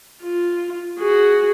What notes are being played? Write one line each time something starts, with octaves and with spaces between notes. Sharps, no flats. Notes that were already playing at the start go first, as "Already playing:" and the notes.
F4
F#4 G#4